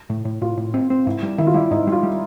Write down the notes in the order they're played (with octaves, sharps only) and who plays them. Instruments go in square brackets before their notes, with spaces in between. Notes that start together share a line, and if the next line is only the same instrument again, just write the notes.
[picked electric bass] A2
A2
[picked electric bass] A2 [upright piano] F4
[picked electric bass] A2
C4
C4
[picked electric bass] G#2 [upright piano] E4
[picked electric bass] G3
[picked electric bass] D#3 [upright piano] E4
[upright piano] F4
[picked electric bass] G3 [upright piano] E4
[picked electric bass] G#2 [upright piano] D#4
[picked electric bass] G3
[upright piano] F4
[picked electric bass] G3